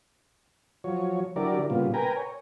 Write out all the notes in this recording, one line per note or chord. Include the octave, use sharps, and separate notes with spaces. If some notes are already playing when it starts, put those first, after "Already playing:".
F3 F#3 C#5
D3 F#3 E4 G4 A#4 D5
A#2 C#3 G3 B3 F4
A#4 B4 G5 G#5 A#5
C#5